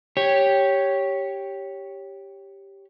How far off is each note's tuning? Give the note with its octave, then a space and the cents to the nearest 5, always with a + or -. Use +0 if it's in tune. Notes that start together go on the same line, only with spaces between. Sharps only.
G4 +0 C#5 +0